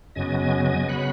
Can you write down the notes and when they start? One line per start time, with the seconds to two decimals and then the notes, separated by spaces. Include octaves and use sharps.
0.15 F#2 C#3 F#3 B3 D#5 G#5
0.40 D#5 G#5
0.64 D#5 G#5
0.89 C#3 F#3 B3 F#5 B5